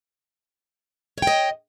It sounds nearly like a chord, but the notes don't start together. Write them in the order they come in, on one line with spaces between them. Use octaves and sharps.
C#5 G5 D#5